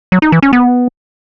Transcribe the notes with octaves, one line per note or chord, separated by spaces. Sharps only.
F#3
D#4
E3
C#4
B3